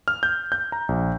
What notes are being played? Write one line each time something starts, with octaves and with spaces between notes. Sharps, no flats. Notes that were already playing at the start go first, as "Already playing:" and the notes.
F6
G6
G6
A#5
A#1